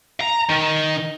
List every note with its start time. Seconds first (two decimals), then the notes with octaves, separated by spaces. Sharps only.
0.21 A#5
0.49 D#3